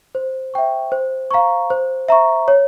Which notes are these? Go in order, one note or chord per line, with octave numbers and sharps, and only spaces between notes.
C5
E5 G5 C#6
C5
F5 A#5 C#6
C5
E5 A#5 C#6
C#5